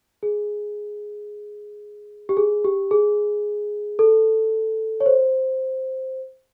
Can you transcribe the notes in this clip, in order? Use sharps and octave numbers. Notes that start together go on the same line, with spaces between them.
G#4
G4
G#4
G4
G#4
A4
C#5
C5